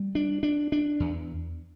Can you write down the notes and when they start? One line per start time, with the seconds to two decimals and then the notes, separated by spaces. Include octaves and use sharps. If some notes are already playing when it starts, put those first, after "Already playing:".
Already playing: G3
0.15 D4
0.43 D4
0.72 D4
1.00 E2